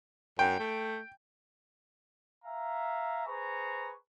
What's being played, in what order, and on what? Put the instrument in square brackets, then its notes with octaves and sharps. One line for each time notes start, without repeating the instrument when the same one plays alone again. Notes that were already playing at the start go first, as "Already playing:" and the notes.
[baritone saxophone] F#2 [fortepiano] G5
[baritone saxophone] A3
[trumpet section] E5 F5 G#5 A#5
G#4 B4 C5 A#5 C#6